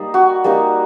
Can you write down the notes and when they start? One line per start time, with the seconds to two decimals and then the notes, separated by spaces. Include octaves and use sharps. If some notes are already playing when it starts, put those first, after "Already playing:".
Already playing: G3 A#3 D#4
0.14 F#4
0.44 G3 A#3 D#4